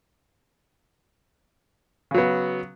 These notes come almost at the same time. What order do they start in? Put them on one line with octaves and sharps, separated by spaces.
C#3 F#3 B3